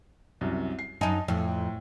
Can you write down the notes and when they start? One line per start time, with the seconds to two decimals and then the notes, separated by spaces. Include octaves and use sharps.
0.41 C2 F#2
0.79 C7
1.01 F#2 D#4 D#5 G#5 A5
1.28 F2 A2